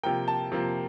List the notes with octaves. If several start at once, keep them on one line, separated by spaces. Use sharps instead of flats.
C3 F3 A#3 G5
A5
C3 F3 A#3